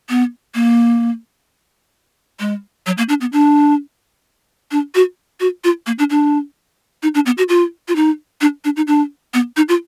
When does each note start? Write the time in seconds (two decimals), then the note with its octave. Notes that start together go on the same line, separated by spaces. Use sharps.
0.09 B3
0.55 A#3
2.40 G#3
2.86 F#3
2.98 A#3
3.09 D4
3.21 B3
3.33 D4
4.71 D4
4.95 F#4
5.40 F#4
5.64 F4
5.86 A#3
5.99 D4
6.10 D4
7.03 D#4
7.15 D4
7.26 B3
7.38 F#4
7.49 F4
7.88 F4
7.96 D#4
8.41 D4
8.65 D4
8.76 D#4
8.87 D4
9.34 B3
9.57 D#4
9.69 F4